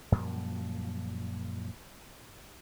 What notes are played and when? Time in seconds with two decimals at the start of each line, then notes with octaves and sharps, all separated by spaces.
0.12 F#2 A#2 F3 G3